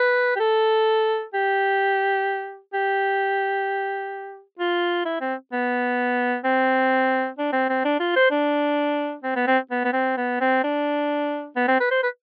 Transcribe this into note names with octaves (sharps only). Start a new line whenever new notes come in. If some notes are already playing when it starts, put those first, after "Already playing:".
Already playing: B4
G4
A4
G4
G4
F4
E4
C4
B3
C4
D4
C4
C4
D4
F4
C5
D4
C4
B3
C4
B3
B3
C4
B3
C4
D4
B3
C4
B4
C5
B4